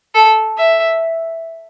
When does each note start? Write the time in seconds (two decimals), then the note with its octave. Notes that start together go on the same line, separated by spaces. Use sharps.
0.15 A4
0.58 E5